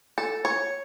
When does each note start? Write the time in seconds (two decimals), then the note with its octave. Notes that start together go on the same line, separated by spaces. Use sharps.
0.18 A4
0.45 C#5